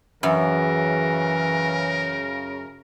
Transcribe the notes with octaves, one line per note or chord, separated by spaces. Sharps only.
F#2 C#3 E3 A#4